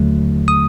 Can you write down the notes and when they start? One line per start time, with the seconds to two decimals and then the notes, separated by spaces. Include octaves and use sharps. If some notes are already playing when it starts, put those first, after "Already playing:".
Already playing: D#2 D3 F#3 A3
0.48 D#6